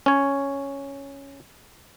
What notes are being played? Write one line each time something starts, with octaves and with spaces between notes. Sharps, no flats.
C#4 C#5